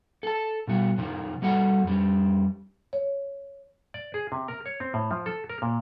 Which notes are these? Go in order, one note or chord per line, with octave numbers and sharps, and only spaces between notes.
A4 A5
B2 G3 F#4
C3 D#3 F3
G3 F#4 A4 F#5
F2 G3
C#5
D5
G#4
C3
A#4
C#5
C4
A2
F3
A4
A#4
A#2